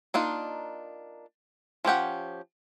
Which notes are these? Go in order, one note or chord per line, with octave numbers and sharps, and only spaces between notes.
A#3 D4 D#4 F4
F3 C#4 G4 F#5